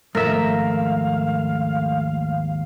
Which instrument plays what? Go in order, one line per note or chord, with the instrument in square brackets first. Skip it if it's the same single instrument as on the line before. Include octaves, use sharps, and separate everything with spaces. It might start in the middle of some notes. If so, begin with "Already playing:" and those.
[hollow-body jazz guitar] D#2 G#2 F3 [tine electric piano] A3 [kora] A#4 E5 [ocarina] F5